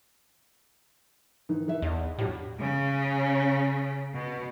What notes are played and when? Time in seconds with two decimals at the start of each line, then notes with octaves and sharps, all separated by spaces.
1.49 G#2 D#3 E3
1.68 E3 E5
1.82 E2 D#5
2.19 A2 F#3 D4 G4
2.61 C#3
4.14 B2